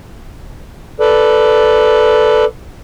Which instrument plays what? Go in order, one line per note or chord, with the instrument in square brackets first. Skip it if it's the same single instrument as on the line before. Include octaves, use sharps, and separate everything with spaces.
[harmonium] A4 B4 D5